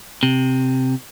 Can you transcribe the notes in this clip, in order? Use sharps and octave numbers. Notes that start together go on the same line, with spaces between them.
C3